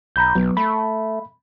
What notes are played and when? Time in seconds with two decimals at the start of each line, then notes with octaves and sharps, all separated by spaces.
0.16 B1 A#5 B5 G6
0.35 B1 F#3 B3
0.57 A3 B5